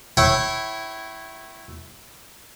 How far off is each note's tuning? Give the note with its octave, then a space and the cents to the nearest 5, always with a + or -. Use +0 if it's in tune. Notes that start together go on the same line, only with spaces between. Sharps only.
E4 +0 C#5 -20 G5 -35